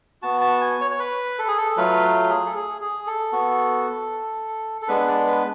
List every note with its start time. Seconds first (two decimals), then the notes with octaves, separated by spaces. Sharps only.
0.22 B3 F#4 A5
0.41 A5
0.61 G#5
0.81 C#5
0.91 C#5
0.99 B4
1.39 A4
1.48 G#4
1.58 A4
1.77 F#3 A3 F4 B4
2.29 G#4
2.46 A4
2.56 G#4
2.82 G#4
3.07 A4
3.33 B3 F#4
4.82 A4
4.88 G#3 B3 D4 B4
5.08 D5
5.27 B4